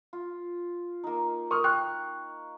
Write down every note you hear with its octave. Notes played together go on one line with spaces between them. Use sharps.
F4
A#3 D#4
A#4 C#6 D#6 F6
G5 C#6 F6 F#6